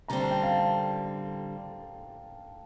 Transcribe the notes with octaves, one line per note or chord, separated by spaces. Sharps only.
D3 G3 C4 A#5
A5
G5
F5 A5